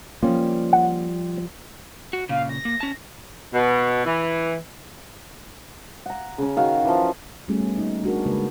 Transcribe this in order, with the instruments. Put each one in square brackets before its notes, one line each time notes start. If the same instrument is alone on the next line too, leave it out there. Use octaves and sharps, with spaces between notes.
[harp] F3 G3 [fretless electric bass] A#3 C#4 [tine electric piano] F4
[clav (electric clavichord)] F#5
[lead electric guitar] F#4
[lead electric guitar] A#2 C#3 [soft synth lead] F5
[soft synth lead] A#6
[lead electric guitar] A#3
C#4 A5
[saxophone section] B2
E3
[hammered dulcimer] F#5 A#5
C#3 C#4
D#3 F#4 F5
E3 F3
[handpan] G3 A3 C#4 F#4 G#4
B3
A#3 D#4
D4 F#4 G#4 A#4
C#3 G#3 A#3 B4